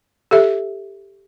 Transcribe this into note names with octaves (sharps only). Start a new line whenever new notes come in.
G4 A4 E5